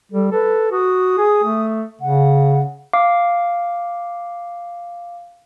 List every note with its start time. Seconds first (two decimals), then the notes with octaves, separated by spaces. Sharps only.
0.12 G3 A4
0.32 A4 B4
0.72 F#4 D#6
1.18 G#4
1.44 A3
2.01 C#3 F#5
2.93 F5 D6